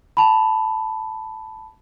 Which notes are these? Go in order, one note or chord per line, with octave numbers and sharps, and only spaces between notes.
A5 B5